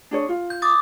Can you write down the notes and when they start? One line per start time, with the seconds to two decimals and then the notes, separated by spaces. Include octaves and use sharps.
0.11 D4 G#4 C#5
0.29 F4
0.50 G6
0.62 D6 D#6 A6